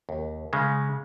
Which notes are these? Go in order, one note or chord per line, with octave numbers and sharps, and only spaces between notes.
D#2
C#3 G#3